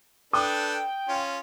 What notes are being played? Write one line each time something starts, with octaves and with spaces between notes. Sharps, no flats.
D4 A4 B4 G5 D#6
C#4 F4